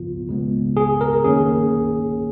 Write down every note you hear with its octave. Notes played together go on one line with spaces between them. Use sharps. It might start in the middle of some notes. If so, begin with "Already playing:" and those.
Already playing: C#3 F3 B3 F4
C#3 G#3 B3
G#4
A#4
D#3 A#3 C#4 G#4